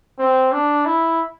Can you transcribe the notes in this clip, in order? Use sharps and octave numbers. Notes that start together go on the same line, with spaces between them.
C4
D4
E4